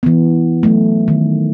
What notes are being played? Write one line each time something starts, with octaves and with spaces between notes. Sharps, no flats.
E3 B3
F#3 A3
D#3